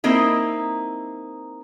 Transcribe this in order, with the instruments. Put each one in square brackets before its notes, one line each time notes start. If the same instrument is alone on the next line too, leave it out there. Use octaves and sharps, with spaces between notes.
[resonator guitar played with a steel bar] A#3 C4 D#4 E4